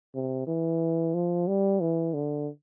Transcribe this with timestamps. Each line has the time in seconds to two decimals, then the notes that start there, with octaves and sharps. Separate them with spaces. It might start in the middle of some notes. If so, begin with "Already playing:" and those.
0.15 C3
0.47 E3
1.15 F3
1.48 G3
1.81 E3
2.14 D3